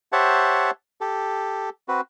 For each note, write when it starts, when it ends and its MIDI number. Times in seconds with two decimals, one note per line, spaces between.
0.12 0.71 67
0.12 0.71 72
0.12 0.71 73
0.12 0.71 76
0.12 0.71 78
0.12 0.71 81
1.01 1.69 67
1.01 1.69 69
1.88 2.01 60
1.88 2.01 66
1.88 2.01 71